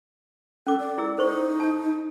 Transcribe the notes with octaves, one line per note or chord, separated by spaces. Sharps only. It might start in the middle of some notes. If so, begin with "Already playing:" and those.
C#4 A4 D6
D5
E4 G#4 E6
D#4 A4 C5 C#6
A5